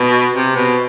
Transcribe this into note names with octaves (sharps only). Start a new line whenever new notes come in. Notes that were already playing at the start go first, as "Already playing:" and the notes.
Already playing: B2
C3
B2